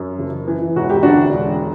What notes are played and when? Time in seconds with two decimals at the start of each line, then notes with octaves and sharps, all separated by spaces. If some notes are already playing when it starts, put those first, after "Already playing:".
Already playing: F#2
0.19 F#1
0.48 E3
0.76 E1 F#4
0.90 G4
1.03 D2 D4 F#4
1.33 E1